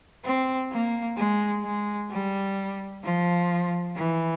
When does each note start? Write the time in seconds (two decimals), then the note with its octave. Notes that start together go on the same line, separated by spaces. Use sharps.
0.25 C4
0.71 A#3
1.17 G#3
1.64 G#3
2.10 G3
3.04 F3
3.96 E3